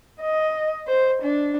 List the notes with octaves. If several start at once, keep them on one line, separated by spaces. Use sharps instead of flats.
D#5
C5
D4